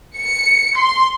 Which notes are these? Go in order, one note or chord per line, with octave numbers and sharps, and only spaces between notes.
C#7
C6